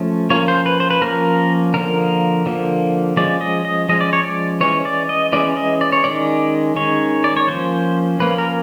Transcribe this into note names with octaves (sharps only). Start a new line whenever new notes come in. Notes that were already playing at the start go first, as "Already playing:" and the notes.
Already playing: F3 A3 C#4
F3 A#3 C#4 C#5
C5
B4
C5
B4
F3 A#3 C#4 A#4
D3 F3 A#3 A#4
D3 F3 A#3
F3 G#3 C#4 D5
D#5
D#5
F3 G#3 C#4 D#5
D5
C#5
D5
E3 G#3 C#4 C#5
D5
D#5
E3 G#3 C#4 D5
D#5
D5
C#5
D#3 G#3 C#4 D5
D#3 G#3 C#4 C#5
D5
C#5
F3 A#3 C#4 C5
F3 A#3 C#4 B4
A#4